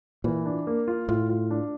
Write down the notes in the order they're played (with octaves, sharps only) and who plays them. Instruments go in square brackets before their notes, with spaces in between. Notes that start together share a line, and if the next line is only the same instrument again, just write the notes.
[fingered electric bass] A#2 [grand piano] E3
[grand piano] D4
A#3
F4
[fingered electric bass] A2 [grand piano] F4
[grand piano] F4
D4